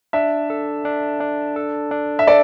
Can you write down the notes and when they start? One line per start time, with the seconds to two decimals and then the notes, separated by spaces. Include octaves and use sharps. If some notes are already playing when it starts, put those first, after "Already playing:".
0.13 D4 E5
0.50 A4
0.85 D4
1.20 D4
1.56 A4
1.91 D4
2.19 E5
2.27 A4 D5